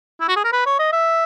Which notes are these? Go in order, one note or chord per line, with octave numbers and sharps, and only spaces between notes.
E4
F#4
G#4
A#4
B4
C#5
D#5
E5